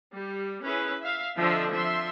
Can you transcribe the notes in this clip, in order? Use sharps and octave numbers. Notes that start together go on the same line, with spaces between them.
G3
C#4 E4 G#4 B4
E5 F5
D3 F3 C4 D4 D#5 E5
F3 E5 C6